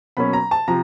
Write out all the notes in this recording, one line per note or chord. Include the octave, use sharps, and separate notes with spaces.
B2 F#3 A#3 C#4 B5
A#5
A5
C3 F3 A#5